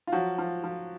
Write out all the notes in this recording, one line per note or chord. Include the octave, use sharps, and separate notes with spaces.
F4
F3 F#3 F#4
F3
F3